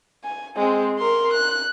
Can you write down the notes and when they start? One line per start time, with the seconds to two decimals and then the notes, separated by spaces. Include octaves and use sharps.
0.24 G#5
0.56 G#3 C4
0.99 A#4 C6
1.33 F#6